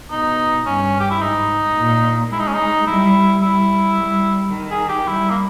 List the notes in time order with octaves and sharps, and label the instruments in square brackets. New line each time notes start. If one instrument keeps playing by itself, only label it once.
[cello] B2 [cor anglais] D#4
[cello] G2 [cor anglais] C#4
[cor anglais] G4
E4
[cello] G#2 [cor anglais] D#4
[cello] A#2
[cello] G#3 [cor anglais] E4
[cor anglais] D#4
C#4
D#4
[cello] G3 [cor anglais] E4
[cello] G3 [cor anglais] E4
[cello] G3
D#3
[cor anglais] G#4
G4
[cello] G3 [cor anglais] E4
[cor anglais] A#3